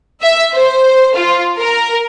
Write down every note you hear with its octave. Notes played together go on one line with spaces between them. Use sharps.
E5
C5
F4
A#4